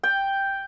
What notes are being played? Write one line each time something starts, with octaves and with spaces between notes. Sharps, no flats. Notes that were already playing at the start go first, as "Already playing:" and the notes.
G5